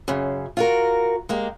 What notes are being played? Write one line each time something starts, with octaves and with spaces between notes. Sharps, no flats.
F#2 C#3
F4 F#4 A#4
G#3 A#3 G4